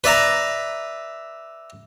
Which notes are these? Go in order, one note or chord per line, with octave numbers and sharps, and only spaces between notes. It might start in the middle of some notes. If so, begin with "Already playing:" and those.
B4 D5 E5 A#5